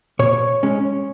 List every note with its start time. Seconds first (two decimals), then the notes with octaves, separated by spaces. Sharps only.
0.19 A#2 C#5
0.63 G#3 C#4